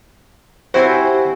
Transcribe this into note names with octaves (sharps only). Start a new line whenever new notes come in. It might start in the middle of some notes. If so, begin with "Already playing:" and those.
C4 E4 F#4 G4 C5 G#5